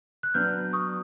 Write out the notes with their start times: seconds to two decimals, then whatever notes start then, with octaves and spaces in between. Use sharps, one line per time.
0.23 F#6
0.34 F#3 B3 D4 F6 G6
0.73 C#6 D#6